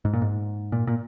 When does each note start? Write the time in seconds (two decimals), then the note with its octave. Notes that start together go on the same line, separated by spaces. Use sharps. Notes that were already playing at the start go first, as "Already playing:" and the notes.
0.05 G#2
0.13 A#2
0.22 G#2
0.72 A#2
0.87 A#2